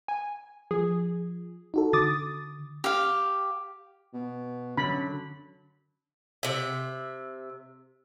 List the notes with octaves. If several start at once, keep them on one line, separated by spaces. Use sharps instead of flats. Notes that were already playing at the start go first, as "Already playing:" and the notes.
G#5
F3 G#4
D#4 F#4 A4
D3 D6 D#6 A6
G4 F5
B2
F#2 D3 F#3 B5
C3 E5